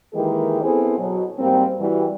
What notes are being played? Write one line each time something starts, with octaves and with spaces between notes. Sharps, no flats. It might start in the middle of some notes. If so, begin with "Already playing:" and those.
D#3 E3 G#3 A#3 G4 G#4
B3 C4 E4 G#4 A4 C5
B2 F#3
G#2 G3 A#3 C4
E3 G3 F#4